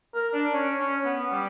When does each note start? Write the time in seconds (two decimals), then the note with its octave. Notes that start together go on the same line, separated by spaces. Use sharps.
0.14 A#4
0.34 D4
0.53 C#4
0.79 C#4
1.05 B3
1.31 G3